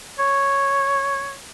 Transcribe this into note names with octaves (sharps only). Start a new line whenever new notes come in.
C#5